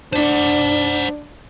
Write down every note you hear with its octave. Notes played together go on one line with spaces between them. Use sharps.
D4 C5 F#5